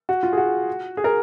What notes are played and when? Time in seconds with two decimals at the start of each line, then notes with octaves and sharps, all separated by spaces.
0.09 F#4
0.23 F4
0.33 G#4
0.38 F#4
0.97 G#4
1.04 A#4